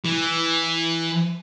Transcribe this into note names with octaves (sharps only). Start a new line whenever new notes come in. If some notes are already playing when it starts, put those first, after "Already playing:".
E3